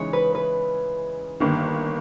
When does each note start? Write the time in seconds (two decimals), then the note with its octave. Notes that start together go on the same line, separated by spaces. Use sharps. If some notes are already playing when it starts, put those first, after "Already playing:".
Already playing: C#3 E3 G#3 D#4 C#5
0.13 B4
0.35 B4
1.40 G1 G2 D#3 A#3